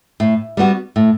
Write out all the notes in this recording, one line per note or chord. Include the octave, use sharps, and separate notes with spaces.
A2
G3 B3 F#4
A2